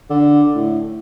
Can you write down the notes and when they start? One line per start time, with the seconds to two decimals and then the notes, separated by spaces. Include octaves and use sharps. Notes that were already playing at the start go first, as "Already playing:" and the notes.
0.10 D3
0.55 A2